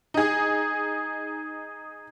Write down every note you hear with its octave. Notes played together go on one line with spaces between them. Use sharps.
D#4 G#4